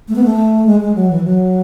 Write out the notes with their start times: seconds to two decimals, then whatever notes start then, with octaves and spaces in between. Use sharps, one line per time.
0.08 A3
0.15 B3
0.24 A3
0.67 G#3
0.80 G#3
0.95 F#3
1.10 E3
1.24 F#3